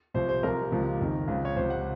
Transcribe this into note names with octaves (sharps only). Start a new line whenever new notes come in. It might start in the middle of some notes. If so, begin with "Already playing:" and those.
C2 C3 F3 C5
C5
C2 C3 F3 A#4
C#2 C3 F3
F#1 F2 D#3
C#2 C#3 F3
C#5
C#2 C3 F3 C5
F#5